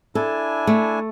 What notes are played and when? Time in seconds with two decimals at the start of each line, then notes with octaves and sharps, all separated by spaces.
0.15 D4 E4 A4 G#5
0.67 A3